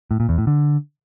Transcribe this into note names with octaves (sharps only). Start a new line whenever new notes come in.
A2
A#2
E2
A2
D3